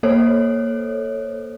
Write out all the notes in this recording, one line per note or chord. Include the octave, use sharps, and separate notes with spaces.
A#3 A4 C5 C#5